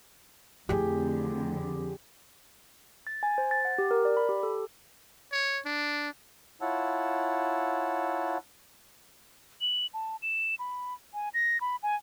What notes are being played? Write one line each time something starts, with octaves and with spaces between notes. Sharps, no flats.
F2 D3 A3 E4 G4 G#4
A6
G#5
C5
A6
F#5
G4
A#4
D5
B5
G4
A4
C#5
D4
E4 F4 C#5 F#5 A5 E6
F#7
A5
E7
B5
G#5
A#6
B5
G#5